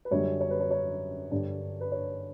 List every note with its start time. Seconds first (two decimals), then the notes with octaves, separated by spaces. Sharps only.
0.05 B4
0.11 F#2 D3 G3 C#5
0.41 C#5
0.50 B4
0.60 C#5
0.71 C#5
1.31 G2 D3 G3 D4
1.81 B4
1.92 C#5